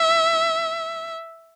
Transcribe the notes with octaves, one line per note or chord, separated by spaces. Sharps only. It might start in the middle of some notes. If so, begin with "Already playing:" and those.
Already playing: E5